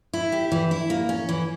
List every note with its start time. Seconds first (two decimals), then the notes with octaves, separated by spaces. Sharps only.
0.13 E4
0.32 G4
0.52 E3
0.71 E4
0.90 A#3
1.09 C#4
1.29 E3